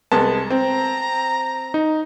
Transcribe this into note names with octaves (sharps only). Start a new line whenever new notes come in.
C2 G#3 B3 A5
C4 A#5
D#4